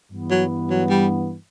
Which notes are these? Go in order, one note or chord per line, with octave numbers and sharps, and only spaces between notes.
G2 E3 B3
F#3
F#3
G3